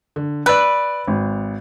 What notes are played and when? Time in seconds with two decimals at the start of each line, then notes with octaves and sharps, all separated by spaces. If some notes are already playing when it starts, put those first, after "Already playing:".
0.16 D3
0.46 B4 D5 E6 F#6
1.08 G#1